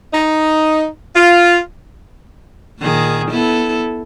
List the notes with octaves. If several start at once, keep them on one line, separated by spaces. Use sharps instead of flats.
D#4
F4
A#2 D#3 G#4
B3 E4 A4